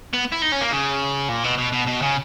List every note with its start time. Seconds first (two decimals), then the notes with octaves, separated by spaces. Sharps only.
0.13 B3
0.32 E4
0.42 D#4
0.52 C#4
0.61 A#3
0.71 C#3
1.29 A#2
1.44 B2
1.58 B2
1.72 B2
1.87 B2
2.02 C#3